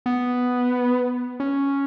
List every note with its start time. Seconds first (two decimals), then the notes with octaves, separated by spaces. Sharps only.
0.06 B3
1.40 C#4